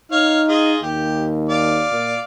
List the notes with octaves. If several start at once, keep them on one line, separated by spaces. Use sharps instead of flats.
D#4 C#5 F5 F6
F4 G#4 D#5
D#2 G4
D5 F5
A#2